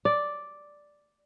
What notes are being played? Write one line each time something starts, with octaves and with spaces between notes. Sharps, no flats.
D5